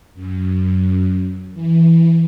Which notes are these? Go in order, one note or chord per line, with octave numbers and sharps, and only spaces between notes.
F#2
E3